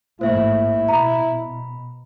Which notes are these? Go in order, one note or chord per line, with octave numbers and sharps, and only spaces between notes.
A1 G#2 A3 A#3 E4 C5 E5
B2 A#5 B5